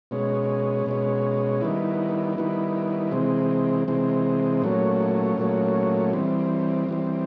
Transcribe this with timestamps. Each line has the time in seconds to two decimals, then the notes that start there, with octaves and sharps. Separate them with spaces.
0.11 B2 G#3 C#4
0.86 B2 G#3 C#4
1.61 D#3 G3 B3 E4
2.37 D#3 G3 B3 E4
3.12 C3 E3 G#3 C4
3.88 C3 E3 G#3 C4
4.62 A#2 F#3 A3 C#4
5.38 A#2 F#3 A3 C#4
6.13 E3 G3 C4
6.89 E3 G3 C4